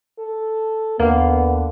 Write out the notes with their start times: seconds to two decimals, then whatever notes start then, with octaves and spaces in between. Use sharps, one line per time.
0.19 A4
1.00 D#2 D3 A#3 B3 F5